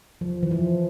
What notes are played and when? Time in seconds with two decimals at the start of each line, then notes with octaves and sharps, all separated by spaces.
0.21 F3
0.43 E3
0.51 F3